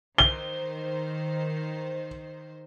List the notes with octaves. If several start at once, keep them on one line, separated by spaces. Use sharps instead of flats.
D#3 C5 G7